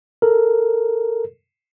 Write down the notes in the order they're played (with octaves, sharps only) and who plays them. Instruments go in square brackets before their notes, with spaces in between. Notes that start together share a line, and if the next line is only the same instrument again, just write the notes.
[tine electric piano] A4 A#4